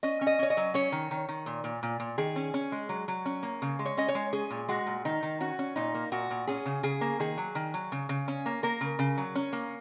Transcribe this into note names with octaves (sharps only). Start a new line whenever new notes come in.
C#4 D#5
C#4
D#5
C#4 C#5
D#5
F#3
C#4 C#5
D#3
D#3
D#3
A#2
A#2
A#2
A#2
D#3 G#4
C#4
C#4
G#3
F#3
F#3
C#4
A#3
C#3
G#3
C#5
C#4 D#5
C#5
G#3
C#4 G#4
A#2
G#3 F#4
A#2
D#3 D#4
D#3
C#4 F#4
C#4
A#2 D#4
A#3
A#2 F#4
A#2
C#4 G#4
C#3
C#3 G#4
A#3
D#3 G#4
F#3
D#3
F#3
C#3
C#3
C#4
A#3
A#3 A#4
C#3
C#3
F#3
C#4
A#3